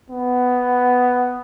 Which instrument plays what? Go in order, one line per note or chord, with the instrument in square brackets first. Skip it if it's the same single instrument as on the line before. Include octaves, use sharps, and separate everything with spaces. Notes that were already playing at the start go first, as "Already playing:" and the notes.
[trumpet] B3